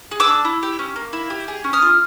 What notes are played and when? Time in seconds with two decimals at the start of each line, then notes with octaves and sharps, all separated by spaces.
0.11 G#4
0.20 D6 E6
0.27 D4
0.45 E4
0.63 G4
0.79 C#4
0.96 A#3
1.13 E4
1.30 G4
1.48 G#4
1.64 C#4
1.73 D#6 F6
1.82 F4